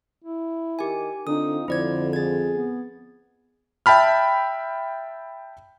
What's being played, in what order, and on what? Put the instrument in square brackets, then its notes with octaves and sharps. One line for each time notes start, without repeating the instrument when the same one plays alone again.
[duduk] E4
[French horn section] D#3 D#4 A#4 [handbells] G4 G#5
[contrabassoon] D3 [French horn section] C4 F4 [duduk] D#4 [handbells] D#6
[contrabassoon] F2 [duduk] D3 [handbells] E4 D5 G#6 [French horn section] C5
[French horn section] G#4 [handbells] G#6 A6
[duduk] B3
[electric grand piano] E5 G5 A5 B5 F6